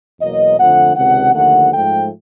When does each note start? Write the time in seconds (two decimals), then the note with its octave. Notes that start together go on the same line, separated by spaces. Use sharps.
0.20 E2 B2 F#3 A#3 D#5
0.58 F2 D3 F3 A3 F#5
0.95 C#2 C3 D#3 F#5
1.34 D#2 D3 F3 A3 F#5
1.72 G#2 F3 A3 G5